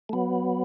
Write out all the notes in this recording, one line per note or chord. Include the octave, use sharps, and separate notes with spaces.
A3
F#3 B3